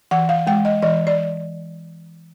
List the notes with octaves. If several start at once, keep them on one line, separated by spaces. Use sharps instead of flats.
E3 F#5
F5
G#3 G5
D#5
E3 D#5
D5